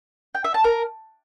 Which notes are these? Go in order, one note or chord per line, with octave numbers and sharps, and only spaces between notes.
G5
E5
A5
A#4